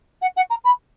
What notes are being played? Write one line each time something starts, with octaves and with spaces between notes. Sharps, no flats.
F#5
F#5
A#5
B5